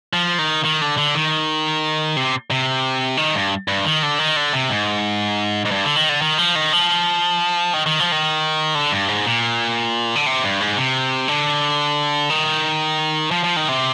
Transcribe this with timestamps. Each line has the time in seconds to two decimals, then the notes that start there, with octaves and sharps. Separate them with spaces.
0.13 F3
0.39 D#3
0.64 D#3
0.81 D3
0.98 D3
1.15 D#3
2.16 C3
2.51 C3
3.17 D#3
3.35 G2
3.68 G2
3.85 D#3
4.03 D3
4.19 D#3
4.36 D3
4.53 C3
4.70 G#2
5.65 G#2
5.71 G2
5.84 D3
5.96 D#3
6.09 D3
6.21 D#3
6.38 F3
6.55 D#3
6.73 F3
7.74 D#3
7.86 D#3
8.00 F3
8.12 D#3
8.75 D3
8.92 G2
9.08 G#2
9.26 A#2
10.16 D3
10.26 C3
10.44 G2
10.61 G#2
10.77 C3
11.28 D3
12.30 D#3
13.31 F3
13.44 F3
13.56 D#3
13.69 C3